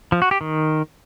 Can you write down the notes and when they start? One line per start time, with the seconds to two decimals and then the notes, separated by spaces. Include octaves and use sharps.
0.12 F3
0.22 F#4
0.31 G4
0.41 D#3